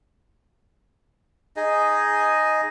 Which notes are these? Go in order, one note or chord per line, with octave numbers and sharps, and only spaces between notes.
D#4 G#4 D#5